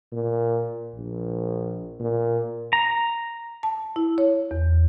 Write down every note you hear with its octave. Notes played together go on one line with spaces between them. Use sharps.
A#2
A#1
A#2
A#5
A5
E4
C#5
E2